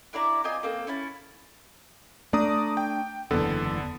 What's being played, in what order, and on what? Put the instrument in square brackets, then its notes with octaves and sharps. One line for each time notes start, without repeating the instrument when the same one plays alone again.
[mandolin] D4 E4 D5 A#5
C4 F4 D#5 G#5
A#3 C4 A4
C#4 E4 A5
[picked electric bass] A3 D4 [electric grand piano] D5 A#5 D#6
[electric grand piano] G5
[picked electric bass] F#1 E2 [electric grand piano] D3 B3 A4